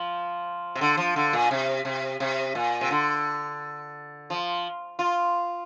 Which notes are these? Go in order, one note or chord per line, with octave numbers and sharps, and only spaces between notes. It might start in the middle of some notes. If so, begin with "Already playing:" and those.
Already playing: F3
C3
D3
F3
D3
A#2
C3
C3
C3
A#2
C3
D3
F3
F4